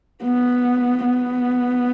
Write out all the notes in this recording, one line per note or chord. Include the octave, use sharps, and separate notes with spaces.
B3
B3